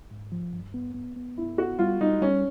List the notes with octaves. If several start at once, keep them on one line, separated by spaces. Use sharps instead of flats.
G#2
F3
G2
B3
B3
B3
G2 E4
B3 F#4
G3 F4
G3 D#4
G3 C#4